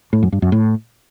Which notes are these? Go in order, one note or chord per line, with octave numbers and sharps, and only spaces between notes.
A2
F#2
G2
F#2
A2